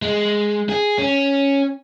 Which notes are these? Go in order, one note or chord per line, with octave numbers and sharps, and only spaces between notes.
G#3
G#4
C#4